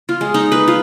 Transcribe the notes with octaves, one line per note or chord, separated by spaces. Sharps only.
F4
G#3
D#4
B4
F4